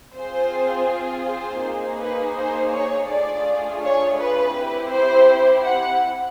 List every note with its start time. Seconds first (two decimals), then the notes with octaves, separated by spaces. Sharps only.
0.14 C4 F4 G#4 C5
1.24 C5
1.62 A#3 D#4 G#4
1.98 B4
2.34 C5
2.72 C#5
3.08 A3 D4 F4 G#4 D5
3.82 C#5
4.17 B4
4.55 C4 E4 G4
4.91 C5
5.64 F#5